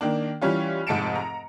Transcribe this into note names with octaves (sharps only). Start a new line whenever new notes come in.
D#3 A#3 D4
E3 G3 C#4 F4
F1 G#2 A5 C#7 D7 E7
A#5